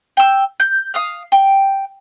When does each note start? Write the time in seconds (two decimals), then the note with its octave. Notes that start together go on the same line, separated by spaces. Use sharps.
0.17 G5 E6
0.60 G6
0.94 F5 D#6 F6
1.32 G5